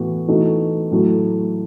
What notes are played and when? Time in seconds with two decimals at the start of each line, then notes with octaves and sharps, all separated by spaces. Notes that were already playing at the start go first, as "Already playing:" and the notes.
Already playing: A2 E3 B3 F#4
0.28 E3 A3 D#4 F#4
0.91 A2 F#3 A3